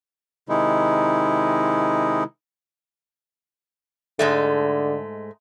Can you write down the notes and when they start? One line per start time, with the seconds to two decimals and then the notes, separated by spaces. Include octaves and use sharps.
0.49 C3 D#3 G#3 D#4 E4
4.19 G#2 D3 G#3 A3